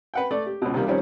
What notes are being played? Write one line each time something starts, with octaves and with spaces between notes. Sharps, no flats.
B4 F#5 G5
A3 D5
G4
C#2 B2
C3 D#3 G3 A#3
D#3 F3 G3 C4 C#4